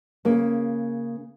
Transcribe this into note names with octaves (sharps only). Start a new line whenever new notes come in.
C#3 A#3